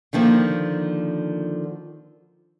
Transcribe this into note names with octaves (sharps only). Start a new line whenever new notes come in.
D3 D#3 F3 A#3